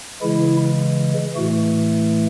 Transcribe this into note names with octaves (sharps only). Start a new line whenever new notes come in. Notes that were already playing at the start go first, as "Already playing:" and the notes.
C#3 E3 G#3 E4
A2 E3 A3 F#4